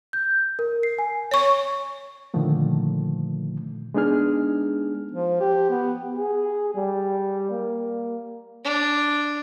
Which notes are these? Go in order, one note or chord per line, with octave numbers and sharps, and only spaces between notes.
G6
A#4
C7
G#5
C#5 C#6
A#2 D3 D#3 F3 A3
G#3 B3 D4 D#4 G#4 F6
F3
G4
B3
G#4
G3
A#3
D4